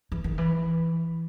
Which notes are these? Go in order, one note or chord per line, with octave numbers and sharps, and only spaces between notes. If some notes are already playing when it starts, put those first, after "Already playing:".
E3
D#3
E3